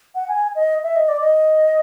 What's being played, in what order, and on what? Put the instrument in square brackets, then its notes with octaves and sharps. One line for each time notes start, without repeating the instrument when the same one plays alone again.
[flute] F#5
G#5
D#5
E5
D#5
D5
D#5